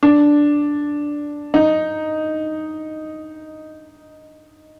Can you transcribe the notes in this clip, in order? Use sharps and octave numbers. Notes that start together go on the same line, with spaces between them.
D4
D#4